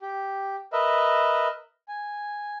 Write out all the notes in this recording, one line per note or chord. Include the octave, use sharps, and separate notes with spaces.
G4
A#4 B4 D#5 E5
G#5